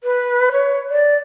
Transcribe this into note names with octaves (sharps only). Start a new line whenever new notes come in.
B4
C#5
D5